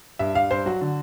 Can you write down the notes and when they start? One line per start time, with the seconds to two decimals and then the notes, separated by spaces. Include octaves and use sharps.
0.19 G2 E5
0.34 G2 F5
0.51 G2 C5
0.66 F#3 F#4
0.81 D3